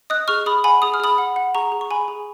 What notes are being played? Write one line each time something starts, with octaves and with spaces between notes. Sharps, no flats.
D#5 D#6 F#6
G#4 C#6 F6
G#4 B5 D#6
F#5 G#5 B5
G#4 D#6
F6
G#4 B5 D#6
F#5
F#5
G#4 A#5 C#6
G#4
C#6
G#4 G#5 B5
G#4